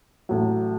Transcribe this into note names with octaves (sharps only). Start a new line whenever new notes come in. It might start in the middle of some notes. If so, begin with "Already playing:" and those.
A1 A2 F#3